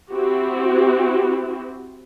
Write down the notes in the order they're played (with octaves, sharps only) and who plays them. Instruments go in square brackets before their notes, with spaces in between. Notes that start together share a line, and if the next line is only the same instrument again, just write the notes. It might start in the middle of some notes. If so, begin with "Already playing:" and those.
[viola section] C4 E4 F#4 G4